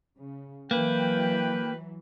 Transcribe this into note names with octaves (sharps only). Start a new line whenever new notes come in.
C#3
E3 F#3 A#3 B4 G5